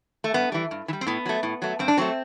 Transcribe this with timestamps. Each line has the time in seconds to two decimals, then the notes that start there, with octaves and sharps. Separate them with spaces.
0.24 A3
0.34 G2 B3
0.52 E3 G3
0.71 G2
0.88 E3
0.93 G3
1.01 C4
1.06 A2 B3
1.26 F#3 A3
1.43 A2
1.62 F#3 A3
1.79 G2 C4
1.88 D4
1.97 F#3 A3 C4